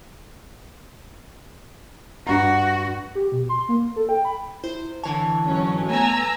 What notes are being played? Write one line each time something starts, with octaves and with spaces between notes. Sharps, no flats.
G2 F#4 A#5
G4
B2
C6
A#3
A4
G5
B5
E4 C5
D3 E3 C#5 A5
G#2 F#3 C#4
A3 B3 G#5 A#5 E6